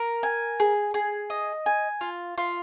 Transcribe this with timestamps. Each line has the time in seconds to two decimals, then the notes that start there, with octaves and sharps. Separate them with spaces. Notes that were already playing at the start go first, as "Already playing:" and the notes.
Already playing: A#4
0.23 G#5
0.60 G#4
0.94 G#4
1.30 D#5
1.66 G#5
2.01 F4
2.38 F4